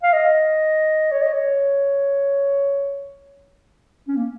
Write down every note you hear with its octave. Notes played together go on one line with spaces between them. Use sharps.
F5
D#5
C#5
D#5
C#5
C#4
A#3